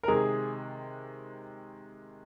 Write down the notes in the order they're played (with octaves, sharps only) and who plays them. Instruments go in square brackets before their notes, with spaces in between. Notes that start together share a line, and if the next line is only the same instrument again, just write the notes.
[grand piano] A#4
[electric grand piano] C3 D#3 G#3 [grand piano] G#4